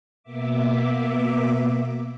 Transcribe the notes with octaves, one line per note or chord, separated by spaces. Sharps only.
B2 A#3 B3 E5 D6